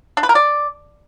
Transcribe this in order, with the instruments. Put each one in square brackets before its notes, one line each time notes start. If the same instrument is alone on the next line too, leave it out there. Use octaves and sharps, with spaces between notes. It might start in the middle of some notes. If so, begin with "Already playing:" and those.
[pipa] D4
B4
A#4
D5